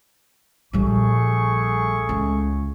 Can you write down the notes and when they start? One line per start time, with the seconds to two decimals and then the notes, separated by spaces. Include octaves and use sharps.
0.73 A#1 G3 A3 G#4 C#6
2.09 C#2